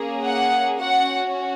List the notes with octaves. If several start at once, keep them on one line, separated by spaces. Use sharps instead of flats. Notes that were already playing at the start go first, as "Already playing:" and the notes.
Already playing: A#3 C#4 G#4
F#5
C#4 F#4 F#5